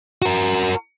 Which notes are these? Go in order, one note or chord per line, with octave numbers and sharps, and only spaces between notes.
F#4 A#4